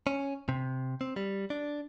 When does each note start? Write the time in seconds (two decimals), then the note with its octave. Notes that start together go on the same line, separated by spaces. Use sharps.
0.07 C#4
0.49 C3
1.01 C4
1.16 G3
1.50 D4